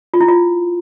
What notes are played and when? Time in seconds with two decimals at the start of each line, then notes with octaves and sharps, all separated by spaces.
0.14 F4
0.21 E4
0.28 F4